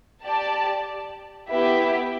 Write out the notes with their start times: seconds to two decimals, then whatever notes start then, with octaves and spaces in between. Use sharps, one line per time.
0.24 G4 D5 A5
1.49 B3 E4 G4 B4 E5